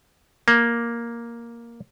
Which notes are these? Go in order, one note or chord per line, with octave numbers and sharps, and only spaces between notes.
A#3